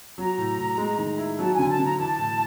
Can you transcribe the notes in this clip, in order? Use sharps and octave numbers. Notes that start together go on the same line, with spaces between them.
F#3 A#5
A2
A2
G#3
D#3
E4
F#3 A5
G#5
D3
A5
D3
A#5
E3 A5
A2